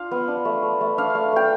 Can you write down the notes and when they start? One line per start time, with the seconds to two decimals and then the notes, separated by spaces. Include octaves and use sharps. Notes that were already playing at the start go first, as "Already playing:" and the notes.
Already playing: D4 F4 F5
0.11 B3
0.28 D4
0.45 A3
0.63 A3
0.81 A3
0.98 D4 F5
1.15 A3
1.32 A3 G5